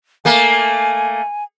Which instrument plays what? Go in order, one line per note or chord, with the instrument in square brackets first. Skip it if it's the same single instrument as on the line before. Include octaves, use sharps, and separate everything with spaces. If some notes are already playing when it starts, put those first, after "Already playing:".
[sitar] A3 A#3 [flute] G#5